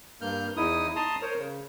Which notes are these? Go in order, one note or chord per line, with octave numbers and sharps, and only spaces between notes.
G2 A#3 F6 G6
E2 D#4 E4 D#6
A5 A#5 C6 D#6
A#4 C5 C#5
C#3